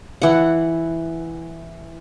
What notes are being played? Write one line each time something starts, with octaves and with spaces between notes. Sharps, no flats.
E3 F#5